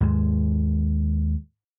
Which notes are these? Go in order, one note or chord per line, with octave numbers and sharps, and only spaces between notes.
D#2 G#2 G#3